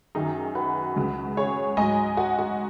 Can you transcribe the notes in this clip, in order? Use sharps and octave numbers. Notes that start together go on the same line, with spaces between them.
F#2 D#3 F#3 D#4 G#4
F#4 B4
C#2 C#3 F#3
G#4 C#5
G#2 F#3 D#5 G#5
F#4
F#4